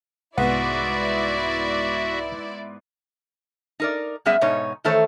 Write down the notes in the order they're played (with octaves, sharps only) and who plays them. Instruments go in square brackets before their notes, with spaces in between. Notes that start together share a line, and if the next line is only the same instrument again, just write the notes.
[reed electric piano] C2 F#5 [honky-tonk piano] G#2 B3 [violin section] E4 D5 [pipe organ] F#4 E5
[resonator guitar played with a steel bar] D#4 A#4 D5
F#2 G3 B3 G#4 E5
G#2 B2 D#4 C#5
D#3 E3 A3 A4 C5 C#5